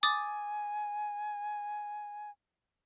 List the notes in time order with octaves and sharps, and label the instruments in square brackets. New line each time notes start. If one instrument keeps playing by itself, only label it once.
[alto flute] G#5 [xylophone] D6 D#6 A6